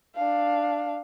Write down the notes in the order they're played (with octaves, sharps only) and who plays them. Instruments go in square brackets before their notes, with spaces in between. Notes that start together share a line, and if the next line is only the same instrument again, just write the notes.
[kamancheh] D4 F5